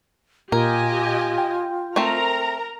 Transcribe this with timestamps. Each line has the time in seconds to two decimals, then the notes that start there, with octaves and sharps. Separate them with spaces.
0.52 A#2 F4 G4 A#4 D#5 G#5
1.38 G5
1.96 A3 C4 A#4 A#5